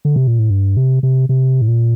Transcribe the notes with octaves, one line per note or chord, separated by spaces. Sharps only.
D3
C3
A#2
A2
G2
C3
C3
C3
A2
A#2